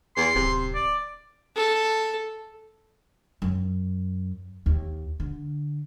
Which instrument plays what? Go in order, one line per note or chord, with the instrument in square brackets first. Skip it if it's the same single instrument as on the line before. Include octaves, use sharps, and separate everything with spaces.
[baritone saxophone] E2 [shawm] C6
[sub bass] D1 [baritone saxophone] C3
[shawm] D5
[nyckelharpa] A4
[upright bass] F#2
D#2
D3